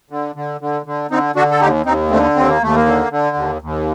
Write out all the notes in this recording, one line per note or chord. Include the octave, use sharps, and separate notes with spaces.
D3
D3
D3
D3
D3 C4 D#4
D3 D4 F#4
A4
D#2 D#4 G4
D#2 C4 D#4
D3 A3 C4
D#2 C4
A#3
D#2 A3
A#3
D3
D3
D#2
D#2